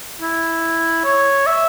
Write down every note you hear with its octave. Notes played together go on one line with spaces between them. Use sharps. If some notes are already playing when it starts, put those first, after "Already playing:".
E4
C#5
E5